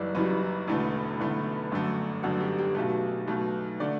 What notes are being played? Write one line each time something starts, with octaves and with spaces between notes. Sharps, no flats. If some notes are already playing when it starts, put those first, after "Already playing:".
Already playing: F#1 F#2 E3 G3 D5
F#1 F#2 E3 G3 B4
E1 E2 D3 A3
E1 E2 D3 A3
G1 F#2 D3 A3
G1 F#2 D3 A3 F#4
G4
G4
B1 B2 A3 G4
B1 B2 A3
D3 A3 D5